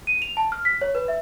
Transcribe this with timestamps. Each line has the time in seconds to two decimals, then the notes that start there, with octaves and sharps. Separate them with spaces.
0.07 D#7
0.22 F7
0.37 A5
0.52 F6
0.65 B6
0.81 C#5
0.95 B4
1.08 E5